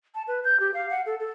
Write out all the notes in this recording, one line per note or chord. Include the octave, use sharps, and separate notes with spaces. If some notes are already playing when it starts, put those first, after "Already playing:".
A5
B4
G6
G4
F5
F#5
A4
A4